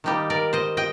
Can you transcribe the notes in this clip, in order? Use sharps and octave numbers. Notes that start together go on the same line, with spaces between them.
D#3 G3 A#3 D#4 G4
A#4 D5
C5 D#5
D#5 G5